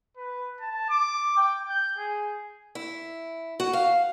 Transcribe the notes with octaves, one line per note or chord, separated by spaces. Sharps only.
B4
A5
D6
G5
G6
G#4
E4
F#4
F5